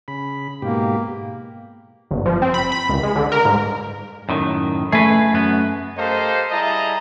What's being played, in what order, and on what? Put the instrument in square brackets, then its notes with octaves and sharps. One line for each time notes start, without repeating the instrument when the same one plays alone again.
[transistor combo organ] C#3 B5
[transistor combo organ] G#2 B2 G4 [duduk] A#3
[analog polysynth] G1
F3
C4
B5
B5
C#2
G#3
D3
A#4
G#2
[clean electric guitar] F#2 A2 D#3
[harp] A3 [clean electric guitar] G#4 B4
[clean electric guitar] F#2 B3
[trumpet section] G4 A4 A#4 C5 D#5 F5
G3 E4 G#4 D#5 A5 A#5